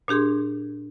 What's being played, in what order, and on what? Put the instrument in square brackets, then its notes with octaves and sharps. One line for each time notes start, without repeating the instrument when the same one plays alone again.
[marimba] A#2 D4 G4 G#4 C6